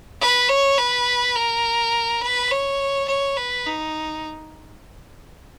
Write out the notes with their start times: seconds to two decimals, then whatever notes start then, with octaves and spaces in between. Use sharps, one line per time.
0.21 B4
0.49 C#5
0.78 B4
1.36 A#4
2.22 B4
2.51 C#5
3.08 C#5
3.37 B4
3.66 D#4